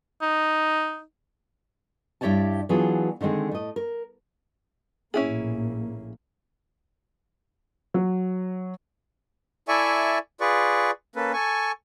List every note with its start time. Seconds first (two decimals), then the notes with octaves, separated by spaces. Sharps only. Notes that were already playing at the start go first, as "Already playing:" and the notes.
0.22 D#4
2.21 G2 E4 G4 C#5 D5 A5
2.69 E3 F#3 B3 D4 F4 G#4
3.21 D3 D#3 G#3 C4 G#4
3.51 A2 D#5
3.76 A#4
5.14 A#1 A2 A#3 C#4 E4 G#4
7.94 F#3
9.68 E4 A4 D5 E5 G#5 C#6
10.41 F4 G#4 B4 D5 C#6
11.16 A#3 C#4 A4 B4
11.33 A4 G#5 C#6